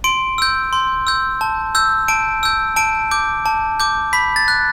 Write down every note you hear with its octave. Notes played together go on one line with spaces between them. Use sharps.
C6 D7
E6 G6
C6
E6 G6
A5
E6 G6
A5 D7
E6 G6
A5 D7
D6 G6
A5
D6 G6
B5 B6
A6
F#6